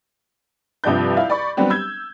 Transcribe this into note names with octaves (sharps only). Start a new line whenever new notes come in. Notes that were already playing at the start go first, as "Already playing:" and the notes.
C2 G2 F3 D5 G6
E4 F5
D5 B5 C#6
F#3 G3 B3 C4 D4 G4
E6 G6 G#6